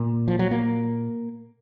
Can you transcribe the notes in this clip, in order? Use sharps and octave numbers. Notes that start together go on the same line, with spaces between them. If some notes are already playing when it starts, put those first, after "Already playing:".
Already playing: A#2
F3
F#3
A#3